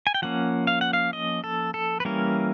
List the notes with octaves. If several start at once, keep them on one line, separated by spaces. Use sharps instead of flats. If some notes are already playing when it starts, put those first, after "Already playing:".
G#5
G5
F3 A#3 C#4 F#5
F5
F#5
F5
D#5
A4
A4
B4
E3 G3 A#3 C#4 A#4